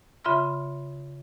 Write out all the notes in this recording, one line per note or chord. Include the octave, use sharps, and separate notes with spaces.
C#3 F4 E5 B5 C6 F6